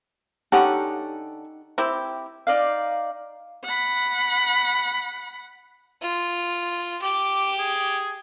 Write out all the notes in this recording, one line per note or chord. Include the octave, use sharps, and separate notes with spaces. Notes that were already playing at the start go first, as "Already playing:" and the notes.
D3 C#4 D#4 G4 A4 F#5 C#6
C4 E4 G4 C5
D#4 D5 F5
F#5 B5
F4
G4 D6
G#4